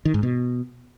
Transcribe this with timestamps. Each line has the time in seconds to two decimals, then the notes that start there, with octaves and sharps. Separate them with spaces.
0.05 D#3
0.14 G#2
0.23 B2